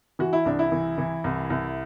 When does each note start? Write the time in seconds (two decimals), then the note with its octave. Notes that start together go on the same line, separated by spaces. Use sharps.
0.19 E3 F#4
0.33 E4
0.46 C2 D4
0.59 E4
0.72 E3
0.98 E3
1.24 C2
1.50 C2